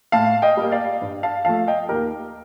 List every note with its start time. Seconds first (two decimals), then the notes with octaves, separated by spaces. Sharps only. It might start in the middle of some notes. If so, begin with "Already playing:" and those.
0.12 A2 F5 A5
0.42 D#5 G5
0.57 G3 A#3
0.71 D5 F5
1.01 G2
1.23 F5 A5
1.45 F3 A3 F5 A5
1.68 D#5 G5
1.89 D#2 G4 A#4